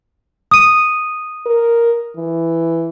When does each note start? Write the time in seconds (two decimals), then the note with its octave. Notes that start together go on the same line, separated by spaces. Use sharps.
0.51 D#6 D#7
1.46 A#4
2.17 E3